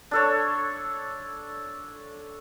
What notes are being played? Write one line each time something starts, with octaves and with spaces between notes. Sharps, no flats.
D4 A4 C#5